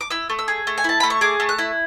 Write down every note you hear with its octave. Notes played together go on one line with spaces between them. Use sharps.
D6
E4 E6
A3
E6
G#4
A3
G#5
E4 A5
A3 B5
C#6
G#4 D6
A3
F#6
E4